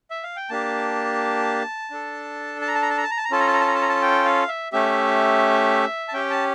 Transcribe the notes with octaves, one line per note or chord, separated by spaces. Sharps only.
E5
F5
G5
A#3 D4 G4 A5
D4 A4
A5
A#5
A5
A#5
A5
A#5
A5
A#5
A5
A#5
C#4 F4 A4 A5
A#5
A5
A#5
A5
A#5
A5
A#5
A5
G5
F5
E5
A3 C#4 G4 E5
A5
C#4 G4 G5
A5